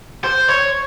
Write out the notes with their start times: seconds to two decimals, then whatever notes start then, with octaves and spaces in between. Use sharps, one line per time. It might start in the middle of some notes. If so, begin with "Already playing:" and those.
0.24 C5
0.48 C#5